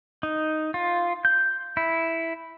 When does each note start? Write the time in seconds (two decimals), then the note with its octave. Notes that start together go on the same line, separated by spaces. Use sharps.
0.23 D#4
0.74 F4
1.25 G6
1.77 E4